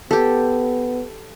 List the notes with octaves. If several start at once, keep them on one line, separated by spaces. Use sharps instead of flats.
B3 G4 A4